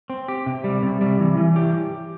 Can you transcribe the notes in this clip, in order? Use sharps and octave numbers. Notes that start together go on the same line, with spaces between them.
C4
G4
C3
G3
C3
G3
E3
E3
G4